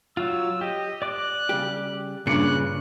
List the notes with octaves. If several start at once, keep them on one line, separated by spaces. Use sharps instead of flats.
F#3 F4 E6
G4 D#5
D5 D6 F#6
C#3 G3 G4
G2 A#2 C#3 D6 F#6 C#7